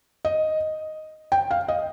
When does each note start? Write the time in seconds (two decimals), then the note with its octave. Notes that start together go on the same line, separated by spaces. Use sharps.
0.25 D#5
1.32 G5
1.51 F5
1.68 D#5